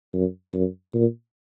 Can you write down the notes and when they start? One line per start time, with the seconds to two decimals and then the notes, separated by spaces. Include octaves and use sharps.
0.13 F#2
0.54 F#2
0.94 A#2